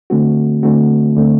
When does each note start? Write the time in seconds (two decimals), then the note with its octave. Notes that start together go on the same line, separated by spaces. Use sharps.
0.10 D3 A3 C4 F#4
0.63 D3 A3 C4 F#4
1.16 D3 A3 C4